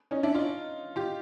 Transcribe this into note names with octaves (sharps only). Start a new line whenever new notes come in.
C#4 D#4
D4 E4
D#4 F4
F4 G4